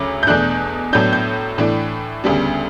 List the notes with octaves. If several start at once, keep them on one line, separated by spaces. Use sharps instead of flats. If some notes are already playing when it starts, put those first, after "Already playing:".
Already playing: D2 C#3 F#3 C#4 D6
G6
E2 B2 A3 D4 F#6
A2 F#3 B3 D4 G6
G6
A2 E3 A3 D4
D2 C#3 G3 B3 D4